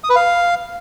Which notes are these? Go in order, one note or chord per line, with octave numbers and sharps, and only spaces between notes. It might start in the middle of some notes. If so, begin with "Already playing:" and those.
D#6
B4
F5